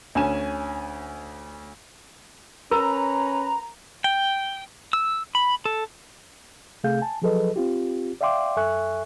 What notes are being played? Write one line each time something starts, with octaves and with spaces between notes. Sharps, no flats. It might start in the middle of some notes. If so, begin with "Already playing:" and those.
D2 C#4 G#5 E7
C#4 A#4 B4 A#5
G5
E6
B5
A4
C3 A3 G#4 F5 G6
G#5 A5
F3 F#3 G#4 A4 B4 D#5
C4 F4 G4
D5 E5 F5 G5 C6 D6
F#2 A4 E5 G#5 C#6 F#6